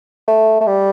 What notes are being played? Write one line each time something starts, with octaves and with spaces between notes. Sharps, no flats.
A3
A3
G3